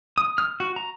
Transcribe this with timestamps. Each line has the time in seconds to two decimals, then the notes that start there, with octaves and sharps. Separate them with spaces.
0.18 D#6
0.38 F6
0.60 F#4
0.76 A#5